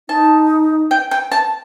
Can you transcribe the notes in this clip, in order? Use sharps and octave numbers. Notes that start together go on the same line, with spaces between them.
D#4 A5
G5
G5
A5